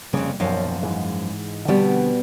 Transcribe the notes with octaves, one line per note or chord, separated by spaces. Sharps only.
F1 F2 C#3 G3 A#3
D#1 B1 F#2 F3 F5
G#2 E3 G#3
B2 D3 F3 G3 B3 C4